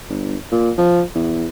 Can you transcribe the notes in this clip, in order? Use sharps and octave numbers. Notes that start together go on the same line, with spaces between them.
G1
A#2
F3
E2